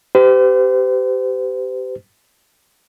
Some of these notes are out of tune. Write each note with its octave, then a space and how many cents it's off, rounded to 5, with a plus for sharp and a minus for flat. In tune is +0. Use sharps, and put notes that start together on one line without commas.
G4 -15 C5 -45